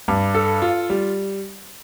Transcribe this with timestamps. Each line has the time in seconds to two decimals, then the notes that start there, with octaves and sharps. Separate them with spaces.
0.08 G2
0.35 A4
0.62 F4
0.90 G3